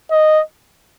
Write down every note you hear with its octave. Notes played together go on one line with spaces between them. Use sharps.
D#5